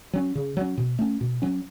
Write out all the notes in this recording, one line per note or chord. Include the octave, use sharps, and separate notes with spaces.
F#3 C#4
C#3
F#3 C#4
B2
A3 C#4
B2
F#3 C#4